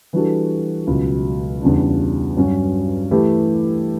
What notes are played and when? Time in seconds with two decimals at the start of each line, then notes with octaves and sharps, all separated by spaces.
0.13 E3 G3 D4 F#4 A4
0.87 C#2 B2 F#3
1.62 E2 C#3 G3 D4
2.37 G2 F#3 C#4 F#4
3.11 E3 A3 E4 G4